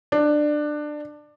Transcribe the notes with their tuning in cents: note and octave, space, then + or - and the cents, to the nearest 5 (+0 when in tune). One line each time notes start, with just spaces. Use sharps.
D4 +20